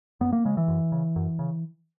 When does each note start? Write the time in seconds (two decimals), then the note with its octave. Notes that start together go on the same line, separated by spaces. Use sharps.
0.21 F#2 B3
0.33 A#3
0.45 C#3 G#3
0.57 E3
0.68 F#2
0.92 C#3
1.16 F#2
1.39 C#3